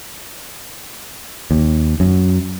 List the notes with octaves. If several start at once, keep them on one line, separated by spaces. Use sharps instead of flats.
D#2
F#2